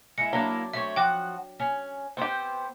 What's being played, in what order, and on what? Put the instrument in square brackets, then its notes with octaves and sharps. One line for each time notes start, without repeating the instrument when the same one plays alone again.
[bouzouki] G#3 E4 [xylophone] C#7
[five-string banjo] F#3 D4 [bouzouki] A#3 E4
[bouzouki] A3 C4 C#5 [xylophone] E5
[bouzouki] F3 F#4 F#5 [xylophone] G5 D6
[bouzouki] C#4
[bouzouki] B3 C5 [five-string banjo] C4 G4